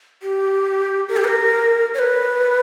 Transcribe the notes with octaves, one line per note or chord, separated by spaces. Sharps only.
G4
A#4
G4
B4
A#4
C#5
B4